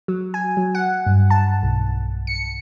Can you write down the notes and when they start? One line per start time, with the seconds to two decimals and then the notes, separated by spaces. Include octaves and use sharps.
0.08 F#3
0.34 G#5
0.57 F#3
0.75 F#5
1.06 G2
1.30 A5
1.63 B1
2.27 C#7